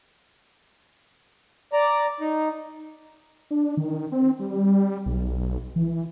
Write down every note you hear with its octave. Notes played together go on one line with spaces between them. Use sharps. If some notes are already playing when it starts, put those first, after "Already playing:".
D5 A#5
D#4
D4
D#3
C4
G3
B1
E3